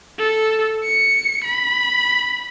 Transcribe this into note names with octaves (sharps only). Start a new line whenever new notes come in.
A4
C#7
B5